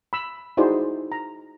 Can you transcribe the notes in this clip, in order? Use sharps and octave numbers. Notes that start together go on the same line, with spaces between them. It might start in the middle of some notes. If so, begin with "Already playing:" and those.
B5 E6
D#4 E4 F#4 G#4 C5 D5
A#5